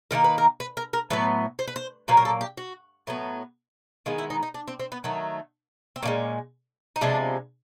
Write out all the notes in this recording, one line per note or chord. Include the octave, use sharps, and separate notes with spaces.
D#3 G3 A#3 A#4
B4
A#4
B4
A#4
A#4
A2 F#3 B3 B4
C5
B4
C5
A#2 F#3 A#3 B4
A#4
A4
G4
F#4
A2 F#3 B3
D#3 G#3 B3 F4
E4
D#4
D#4
D4
C4
C4
B3
D#3 F#3 A3
C4
A#2 F3 G#3 C#4
D#4
C3 F3 G#3 B3 D4